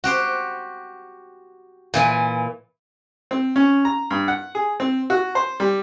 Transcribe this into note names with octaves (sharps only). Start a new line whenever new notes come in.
F#4 G4 C5
A#2 E3 G#5
C4
C#4
A#5
G2
F#5
G#4
C4
F#4
C5
G3